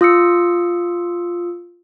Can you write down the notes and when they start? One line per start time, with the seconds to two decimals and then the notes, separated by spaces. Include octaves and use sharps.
0.01 F4 D#6 E6 C#7